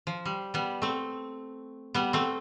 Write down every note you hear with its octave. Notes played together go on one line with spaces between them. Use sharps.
F3
G3
G3 B3
A3 C4
G3 B3
A3 C4